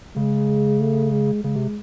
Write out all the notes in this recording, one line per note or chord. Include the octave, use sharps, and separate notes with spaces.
C#3 G#3
A3
G#3
C#3 G#3
C3